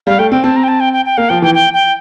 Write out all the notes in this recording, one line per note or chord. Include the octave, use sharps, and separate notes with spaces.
G3 F5
A3 G5
C4 G5
C4 A5
A#5
G5
A5
G5
G5
G5
A#3 F5
F3 G5
E3 G5
G5
G5